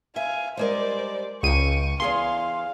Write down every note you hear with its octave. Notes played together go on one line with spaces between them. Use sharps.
E5 F5 G#5
G3 G#3 A#4 C5 D5
C#2 F5 G5 C#6 D#7
E2 G#4 F5 G#5 C6